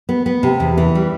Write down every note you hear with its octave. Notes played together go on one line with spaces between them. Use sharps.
B3
B3
C3
E2
E3
G3